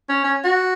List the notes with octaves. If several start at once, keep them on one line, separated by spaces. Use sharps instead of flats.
C#4
C#4
F#4